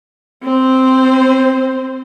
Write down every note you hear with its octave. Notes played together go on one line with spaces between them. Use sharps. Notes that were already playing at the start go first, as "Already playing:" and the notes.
C4 C5